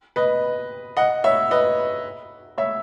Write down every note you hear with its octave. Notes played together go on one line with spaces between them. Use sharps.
B4 D#5
D#5 F#5
C#5 E5
B4 D#5
C#5 E5